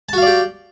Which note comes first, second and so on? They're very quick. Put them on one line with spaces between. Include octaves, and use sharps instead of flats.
A5 F#4 F5 D5 G4